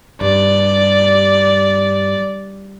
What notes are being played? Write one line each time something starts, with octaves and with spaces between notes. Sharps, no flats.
G2 D5